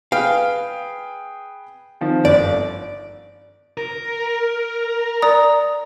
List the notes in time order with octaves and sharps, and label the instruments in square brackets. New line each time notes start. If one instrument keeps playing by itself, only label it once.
[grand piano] G#4 B4 G5 [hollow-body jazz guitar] F5
[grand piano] D#3 F3 C4
[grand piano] G1 [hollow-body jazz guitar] D5
[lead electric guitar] A#4
[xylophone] D5 A#5 D#6